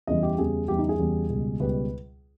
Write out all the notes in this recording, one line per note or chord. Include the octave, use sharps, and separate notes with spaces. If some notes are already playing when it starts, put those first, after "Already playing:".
E2 C#3 E3 G3 D#5
G4
E2 C#3 E3 G3 G#4
E2 C#3 E3 G3 G4
D#4
G#4
E2 C#3 E3 G3
C#2 B2 G3
C#2 B2 G3 B4